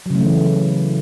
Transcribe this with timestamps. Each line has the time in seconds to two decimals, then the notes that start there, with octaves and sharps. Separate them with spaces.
0.06 F#3
0.10 C#3
0.15 A3
0.19 E3